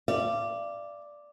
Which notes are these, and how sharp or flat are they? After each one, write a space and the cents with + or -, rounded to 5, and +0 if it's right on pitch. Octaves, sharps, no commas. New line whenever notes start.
D5 +0 F5 -40